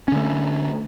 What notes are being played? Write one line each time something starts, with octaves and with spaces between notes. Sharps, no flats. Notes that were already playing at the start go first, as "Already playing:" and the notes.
D3 A3 C#4